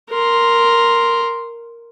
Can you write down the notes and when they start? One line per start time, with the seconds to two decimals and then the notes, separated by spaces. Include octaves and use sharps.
0.11 A#4 C6